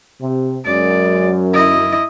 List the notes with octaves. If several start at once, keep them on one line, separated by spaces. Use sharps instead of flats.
C3
F#2 G#3 D5
E4 D#5